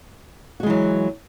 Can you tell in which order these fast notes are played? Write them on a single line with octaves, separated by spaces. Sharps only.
F#4 G#3 E3 F#3